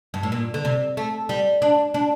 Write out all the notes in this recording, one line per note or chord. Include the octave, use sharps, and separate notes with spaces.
G2
A2
A#2
D3
C3
A3
G3
D4
D4